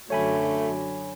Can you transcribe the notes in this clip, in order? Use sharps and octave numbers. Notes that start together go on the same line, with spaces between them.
F#2 D3 F#3 A3 C#5 G#5 B5